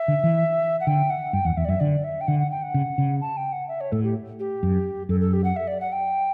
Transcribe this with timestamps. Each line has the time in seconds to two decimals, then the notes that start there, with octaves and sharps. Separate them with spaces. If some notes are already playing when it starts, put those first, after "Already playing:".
Already playing: E5
0.08 D3
0.24 E3
0.80 F#5
0.87 D3 G5
1.10 F#5
1.33 G2 G5
1.45 E2 F#5
1.57 E2 E5
1.65 D5
1.68 F#2 E5
1.80 D3 D5
2.04 E5
2.21 G5
2.27 D3 F#5
2.39 F#5
2.51 G5
2.62 F#5
2.74 C#3
2.98 C#3
3.21 A5
3.37 G5
3.52 F#5
3.68 E5
3.81 C#5
3.92 A2 A4
4.04 G4
4.39 G4
4.63 F#2
5.09 F#2 A4
5.20 A4
5.33 G4
5.44 F#5
5.56 E5
5.67 D5
5.80 F#5
5.92 G5